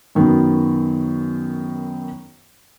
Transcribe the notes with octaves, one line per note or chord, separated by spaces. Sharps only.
F#2 D#3 F#3 B3